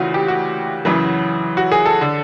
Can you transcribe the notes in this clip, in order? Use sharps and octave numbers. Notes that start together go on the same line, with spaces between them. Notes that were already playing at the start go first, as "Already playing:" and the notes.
Already playing: D2 C#3 E3 F4 F#4
G4
F#4
F#2 C#3 E3
F#4
G#4
A4
D3